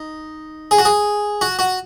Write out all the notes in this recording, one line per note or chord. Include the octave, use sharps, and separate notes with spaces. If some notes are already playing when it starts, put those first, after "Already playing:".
Already playing: D#4
G#4
F#4
G#4
F#4
F#4